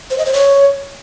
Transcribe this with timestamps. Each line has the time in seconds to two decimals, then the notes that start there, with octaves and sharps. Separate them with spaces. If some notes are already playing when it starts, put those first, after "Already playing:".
0.10 C5
0.18 D#5
0.26 C5
0.33 C#5